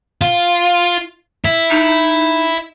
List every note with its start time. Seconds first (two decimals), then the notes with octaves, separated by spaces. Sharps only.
0.21 F4
1.45 E4
1.70 D#4